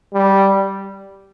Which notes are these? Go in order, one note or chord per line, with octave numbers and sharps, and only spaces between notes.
G3